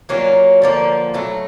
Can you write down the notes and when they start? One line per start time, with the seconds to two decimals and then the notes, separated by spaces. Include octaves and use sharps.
0.09 F#3 A#3 C#4 F4
0.62 D3 F3 A#3
1.14 B2 F#3 A3